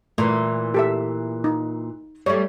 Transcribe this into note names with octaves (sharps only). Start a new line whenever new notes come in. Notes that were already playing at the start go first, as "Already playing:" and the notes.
A#2 E3 A3
G4 A4 E5
D#4
G3 A3 C#5